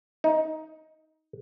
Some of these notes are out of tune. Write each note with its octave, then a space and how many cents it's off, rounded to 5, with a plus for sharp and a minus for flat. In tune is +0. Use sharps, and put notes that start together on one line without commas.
D#4 +15